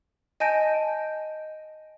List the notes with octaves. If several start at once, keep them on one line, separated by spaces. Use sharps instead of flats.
D#5 G#5 A5 G6 A#6 D7